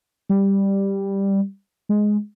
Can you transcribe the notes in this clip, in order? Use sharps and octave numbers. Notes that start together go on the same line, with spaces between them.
G3
G#3